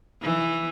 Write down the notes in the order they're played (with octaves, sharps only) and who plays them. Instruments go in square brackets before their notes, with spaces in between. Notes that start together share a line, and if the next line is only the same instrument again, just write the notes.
[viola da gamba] E3